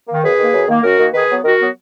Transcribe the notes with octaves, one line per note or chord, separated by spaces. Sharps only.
D#3 A#3
F#2 G#4 B4
D#3 A#3
F#2
D#3 A#3
F#2 F#4 A#4
D#3 A#3
D#3 G#4 B4
F#3 B3
D#3 F#4 A#4
F#3 B3